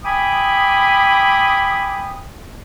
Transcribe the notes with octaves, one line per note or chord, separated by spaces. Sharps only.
E5 G5 G#5 B5 D6 D#6